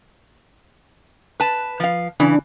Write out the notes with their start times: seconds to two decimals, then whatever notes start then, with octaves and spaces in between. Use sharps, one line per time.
1.40 B4 A5
1.80 F3 F5
2.20 C#3 E3 D4